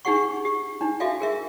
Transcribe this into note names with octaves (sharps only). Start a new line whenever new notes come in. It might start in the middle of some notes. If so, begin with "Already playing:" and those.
D4 D#4 G4 G#4 F#5 C#6
G4
D4 D#4
F#4 A4 E5 F5 G#5
G#4 A#4 E5